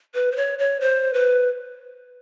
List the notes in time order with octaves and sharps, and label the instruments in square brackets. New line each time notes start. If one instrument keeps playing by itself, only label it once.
[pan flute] B4
C5
C#5
C#5
C5
B4